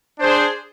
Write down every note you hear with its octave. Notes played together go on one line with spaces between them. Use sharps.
D4 G#4 C5